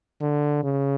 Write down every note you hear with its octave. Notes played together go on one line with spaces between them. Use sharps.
D3
C#3